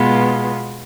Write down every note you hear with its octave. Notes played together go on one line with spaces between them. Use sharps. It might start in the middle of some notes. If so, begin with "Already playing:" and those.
Already playing: B2 G#3 B3 F4